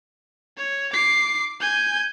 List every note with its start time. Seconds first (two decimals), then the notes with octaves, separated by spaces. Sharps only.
0.57 C#5
0.93 D6 C7
1.60 G#5 G6